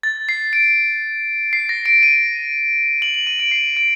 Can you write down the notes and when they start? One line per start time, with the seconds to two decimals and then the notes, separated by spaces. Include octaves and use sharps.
0.03 A6
0.29 C7
0.53 D7
1.53 C7
1.69 A#6
1.86 D7
2.03 D#7
3.02 F#7
3.14 F#7
3.27 D#7
3.39 D7
3.51 C7
3.77 D7